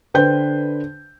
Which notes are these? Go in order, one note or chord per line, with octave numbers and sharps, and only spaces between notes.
D3 B4 C5 G5 G6